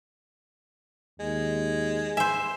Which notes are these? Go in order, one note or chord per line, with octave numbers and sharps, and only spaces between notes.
D#2 G#3
C5 E5 G#5